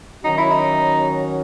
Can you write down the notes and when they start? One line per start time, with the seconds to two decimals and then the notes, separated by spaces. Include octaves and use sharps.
0.24 D#3 F#3 C#4 D#4 F#4
0.38 E4
0.51 D#4